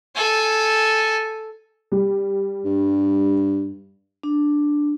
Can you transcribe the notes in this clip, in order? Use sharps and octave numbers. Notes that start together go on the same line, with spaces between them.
A4 G#5
G3
G2
D4